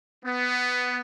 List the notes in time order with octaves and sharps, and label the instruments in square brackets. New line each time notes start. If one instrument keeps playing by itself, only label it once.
[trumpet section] B3